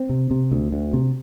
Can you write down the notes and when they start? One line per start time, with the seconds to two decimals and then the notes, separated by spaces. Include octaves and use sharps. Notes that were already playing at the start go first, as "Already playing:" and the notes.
Already playing: C4
0.09 C3
0.31 C3
0.52 D2
0.72 D2
0.93 C3